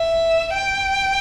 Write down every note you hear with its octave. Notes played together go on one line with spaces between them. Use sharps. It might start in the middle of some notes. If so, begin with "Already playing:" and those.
Already playing: E5
G5